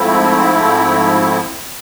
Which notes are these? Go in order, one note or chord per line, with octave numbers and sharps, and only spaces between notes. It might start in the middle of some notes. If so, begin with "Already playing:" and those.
Already playing: G#2 F3 A3 C4 E4